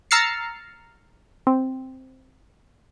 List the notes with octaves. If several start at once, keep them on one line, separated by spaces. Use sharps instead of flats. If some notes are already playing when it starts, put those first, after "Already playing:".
A#5 E6 F6 A6 C7 C#7
C4